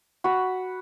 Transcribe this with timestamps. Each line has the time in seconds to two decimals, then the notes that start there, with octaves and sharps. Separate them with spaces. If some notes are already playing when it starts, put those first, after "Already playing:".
0.24 F#4 B5